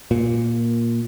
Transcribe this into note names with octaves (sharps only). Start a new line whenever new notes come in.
A#2